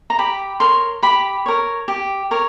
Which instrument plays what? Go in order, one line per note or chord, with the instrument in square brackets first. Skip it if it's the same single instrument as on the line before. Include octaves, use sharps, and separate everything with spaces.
[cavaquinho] A#5
G4 B5
A#4 C#5 C6
G4 B5
A#4 C#5
G4
A#4 C#5